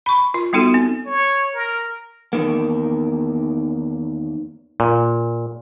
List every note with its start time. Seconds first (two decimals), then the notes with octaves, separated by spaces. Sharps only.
0.06 B5 C#6
0.34 F4
0.53 G3 B3 D#4 F#4 A4
0.74 C4
1.07 C#5
1.55 A#4
2.33 E2 D#3 A#3
4.80 A#2